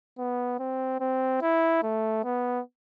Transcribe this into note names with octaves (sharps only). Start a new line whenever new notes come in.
B3
C4
C4
E4
A3
B3